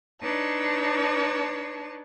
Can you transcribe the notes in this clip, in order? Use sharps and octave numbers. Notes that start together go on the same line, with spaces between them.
D4 D#4 B4 C#5 A5